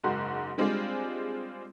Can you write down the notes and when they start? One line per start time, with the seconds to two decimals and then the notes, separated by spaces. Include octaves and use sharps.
0.03 F#1 G#2 F#4 C6
0.58 G3 G#3 C4 D4 F4 G#4